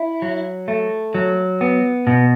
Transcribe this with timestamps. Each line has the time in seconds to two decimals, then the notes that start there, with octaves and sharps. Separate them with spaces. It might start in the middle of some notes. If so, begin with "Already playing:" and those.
Already playing: E4
0.22 F#3
0.68 A3
1.15 F#3
1.61 B3
2.07 B2